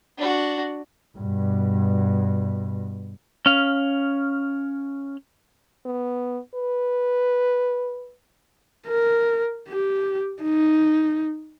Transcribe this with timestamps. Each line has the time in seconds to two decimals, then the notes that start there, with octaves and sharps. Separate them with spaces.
0.17 D4 F#4
1.18 G2 B2
3.46 C#4 F5
5.86 B3
6.55 B4
8.88 A#4
9.69 G4
10.43 D#4